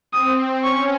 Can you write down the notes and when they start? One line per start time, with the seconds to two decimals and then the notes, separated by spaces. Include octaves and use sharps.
0.12 C4 D#6
0.63 C#4 C#6